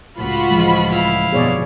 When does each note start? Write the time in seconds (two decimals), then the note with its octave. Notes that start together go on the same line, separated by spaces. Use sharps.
0.17 C#2 A2 F4 F#4 B5
0.51 E3 F3 G#3
0.89 E4 F5
1.32 G1 F2 B2 G#4 C#5 D5